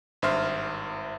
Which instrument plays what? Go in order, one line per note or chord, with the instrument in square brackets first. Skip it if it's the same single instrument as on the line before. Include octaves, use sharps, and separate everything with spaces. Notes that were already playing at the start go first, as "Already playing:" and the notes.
[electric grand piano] G#1 G2 C5 E5 C6 F6